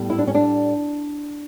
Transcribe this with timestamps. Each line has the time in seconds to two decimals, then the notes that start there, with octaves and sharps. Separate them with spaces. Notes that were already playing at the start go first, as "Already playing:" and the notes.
Already playing: A2 G3 B3
0.10 E4
0.18 D4
0.27 C#4
0.35 D4